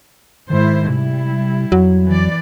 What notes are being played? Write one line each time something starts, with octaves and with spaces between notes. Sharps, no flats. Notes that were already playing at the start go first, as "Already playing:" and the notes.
G#2 D#3 E4 C5
C3 G3 E4
F2 F#3
E3 D5